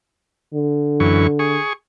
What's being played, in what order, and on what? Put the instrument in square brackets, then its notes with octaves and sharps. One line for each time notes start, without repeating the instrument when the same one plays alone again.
[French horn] D3
[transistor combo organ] F#2 E3 C#6
G#4 C#6